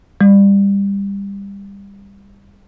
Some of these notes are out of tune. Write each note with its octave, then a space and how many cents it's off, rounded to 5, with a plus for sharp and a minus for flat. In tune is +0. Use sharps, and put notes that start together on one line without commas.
G3 +20